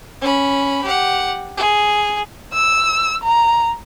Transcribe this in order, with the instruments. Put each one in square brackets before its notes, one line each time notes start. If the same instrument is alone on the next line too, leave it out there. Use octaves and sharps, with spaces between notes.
[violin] C#4 B5
G4 F#5
G#4
[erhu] E6
A#5